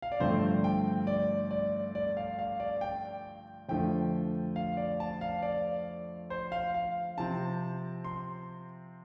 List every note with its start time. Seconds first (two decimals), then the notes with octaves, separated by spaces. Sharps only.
0.02 F5
0.12 D5
0.20 G2 D3 F3 A3 C4 C5
0.64 G5
1.07 D5
1.51 D5
1.95 D5
2.17 F5
2.39 F5
2.60 D5
2.81 G5
3.69 F2 D3 F3 A3 G5
4.56 F5
4.77 D5
5.00 A5
5.21 F5
5.42 D5
6.30 C5
6.52 F5
6.74 F5
7.18 C3 F3 C4 A5
8.04 C6